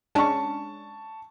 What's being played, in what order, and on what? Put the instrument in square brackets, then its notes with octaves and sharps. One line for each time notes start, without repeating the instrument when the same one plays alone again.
[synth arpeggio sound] G#3 C#4 D4 [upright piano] A5 C#6